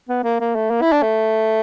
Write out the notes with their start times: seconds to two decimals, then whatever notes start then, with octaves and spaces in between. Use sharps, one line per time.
0.09 B3
0.24 A#3
0.40 A#3
0.55 A3
0.71 A#3
0.81 E4
0.92 D4
1.02 A3